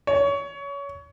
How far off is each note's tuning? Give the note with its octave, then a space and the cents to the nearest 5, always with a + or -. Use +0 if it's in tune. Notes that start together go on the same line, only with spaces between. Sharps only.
C#5 +25